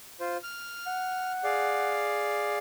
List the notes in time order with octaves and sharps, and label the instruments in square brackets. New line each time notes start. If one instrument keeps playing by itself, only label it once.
[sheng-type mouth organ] F4 C5
F6
[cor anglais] F#5
[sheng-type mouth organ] G#4 D5 F5